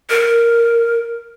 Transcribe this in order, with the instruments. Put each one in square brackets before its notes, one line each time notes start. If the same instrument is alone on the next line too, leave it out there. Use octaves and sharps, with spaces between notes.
[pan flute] A#4